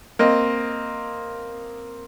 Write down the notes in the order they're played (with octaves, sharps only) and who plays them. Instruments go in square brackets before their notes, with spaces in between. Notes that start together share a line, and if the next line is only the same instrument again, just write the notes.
[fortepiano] A#3 C4 D#5